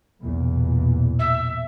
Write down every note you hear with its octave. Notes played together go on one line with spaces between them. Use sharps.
B1 E2 A#2
E5